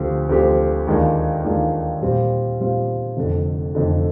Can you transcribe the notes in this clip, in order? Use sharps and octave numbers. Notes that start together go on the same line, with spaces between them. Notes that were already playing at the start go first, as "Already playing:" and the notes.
Already playing: D2 D3 F3 C4 G4
D2 D3 F3 C4 G4
D#2 D#3 G#3 D4 F4
D#2 D#3 G#3 D4 F4
A#2 G3 C4 F4
A#2 G3 C4 F4
F1 F2 D3
F1 F2 D3